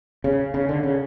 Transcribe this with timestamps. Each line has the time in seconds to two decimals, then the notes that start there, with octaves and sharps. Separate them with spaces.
0.24 C#3
0.54 C#3
0.69 D3
0.83 C#3